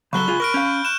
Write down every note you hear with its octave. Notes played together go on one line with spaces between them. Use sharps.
C#3 F#3 A4 B5 C#6 F#6 G7
C#2 F4 G#4
A#4 C#6 F6 D7
C#4 F5 G6
F#6 E7